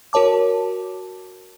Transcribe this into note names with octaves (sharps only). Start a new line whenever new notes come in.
F#4 A#4 C#5 A5 D6